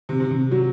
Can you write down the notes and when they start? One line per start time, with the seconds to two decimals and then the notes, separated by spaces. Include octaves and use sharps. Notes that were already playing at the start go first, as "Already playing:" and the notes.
0.09 C3
0.20 C3
0.31 C3
0.51 F#3